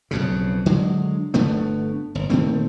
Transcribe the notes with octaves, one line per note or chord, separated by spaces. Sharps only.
B1 F2 C#3
D3 F#3 G#3
G1 D3 A3 B3
G1
A#2 D#3 A3 C4